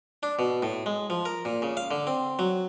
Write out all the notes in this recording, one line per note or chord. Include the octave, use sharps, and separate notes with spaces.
D4
B2
A2
G#3
F3
A#4
A#2
C#3
F5
D3
C4
F#3